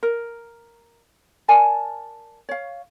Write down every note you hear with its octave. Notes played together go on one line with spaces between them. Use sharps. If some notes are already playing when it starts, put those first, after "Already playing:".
A#4
A#4 D5 G#5 A5
C#5 F5